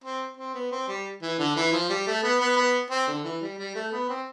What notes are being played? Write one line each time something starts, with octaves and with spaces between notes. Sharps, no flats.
C4
C4
B3
C4
G3
E3
D3
E3
F3
G3
A3
B3
B3
B3
C4
D3
E3
G3
G3
A3
B3
C4